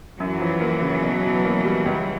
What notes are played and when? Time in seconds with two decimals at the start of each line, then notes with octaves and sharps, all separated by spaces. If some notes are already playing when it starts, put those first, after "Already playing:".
0.19 F#2 E3 F#3
0.40 F3
0.60 A#3
0.82 C#3
1.02 B2
1.23 B2
1.44 A#3
1.64 G3
1.85 C#2